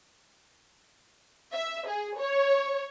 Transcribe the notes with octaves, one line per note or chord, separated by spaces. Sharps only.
E5
G#4
C#5